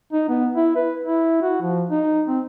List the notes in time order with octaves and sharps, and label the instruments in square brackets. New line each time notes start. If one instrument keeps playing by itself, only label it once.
[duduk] D#4
B3
E4
B4
E4
F#4
F3
D#4
C4